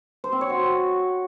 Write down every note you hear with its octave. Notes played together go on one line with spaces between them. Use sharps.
C5
C4
C#5
F#4